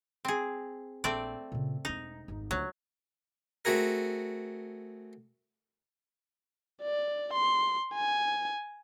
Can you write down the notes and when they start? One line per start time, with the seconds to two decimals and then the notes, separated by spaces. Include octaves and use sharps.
0.25 C4 G#4
1.04 A#1 A3 C4 D5
1.52 A#2 C#3
1.85 E1 C4 D#4
2.28 G#1 F2
2.51 D2 F#3 F4
3.65 A3 C4 F#4 G#4 A#4
6.82 D5
7.33 C6
7.94 G#5